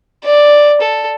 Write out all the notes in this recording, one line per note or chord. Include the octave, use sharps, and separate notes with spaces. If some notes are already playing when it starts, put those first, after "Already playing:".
D5
A4